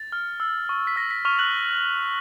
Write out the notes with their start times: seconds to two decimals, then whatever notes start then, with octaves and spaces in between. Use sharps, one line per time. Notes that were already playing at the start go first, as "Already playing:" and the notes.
Already playing: A6
0.12 F6
0.40 E6
0.69 C#6
0.87 B6
0.96 E6 A#6
1.11 B6
1.25 C#6 F6 F7
1.39 F#6 F#7